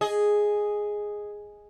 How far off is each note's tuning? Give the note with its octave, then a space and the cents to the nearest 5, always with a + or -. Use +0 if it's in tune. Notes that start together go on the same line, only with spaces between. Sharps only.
G#4 +0 D#5 +0